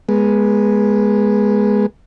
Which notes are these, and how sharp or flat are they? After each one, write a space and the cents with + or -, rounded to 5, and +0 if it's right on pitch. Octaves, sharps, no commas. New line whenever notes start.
G#3 +0 B3 -20